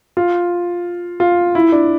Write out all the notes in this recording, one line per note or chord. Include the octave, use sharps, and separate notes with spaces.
F4
F4
E4
D4